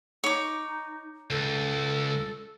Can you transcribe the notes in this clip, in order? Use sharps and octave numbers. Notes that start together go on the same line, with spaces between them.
D#4 C#5 D6
C#2 A4